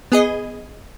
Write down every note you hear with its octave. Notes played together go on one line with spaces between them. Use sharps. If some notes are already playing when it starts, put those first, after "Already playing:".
B3 G#4 D#5